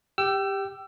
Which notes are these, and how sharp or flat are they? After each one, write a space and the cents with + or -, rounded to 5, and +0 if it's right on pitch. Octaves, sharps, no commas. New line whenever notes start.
G4 +15 G5 -20 E6 +25